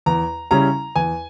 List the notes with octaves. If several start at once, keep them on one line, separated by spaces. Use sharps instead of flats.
E2 A#5
C#3 G3 C#4 E4 A#5
E2 G#5